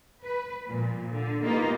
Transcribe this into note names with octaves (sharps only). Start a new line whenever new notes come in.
B4
A#2 F3
D3
A#3 B3 D#4 F4 G4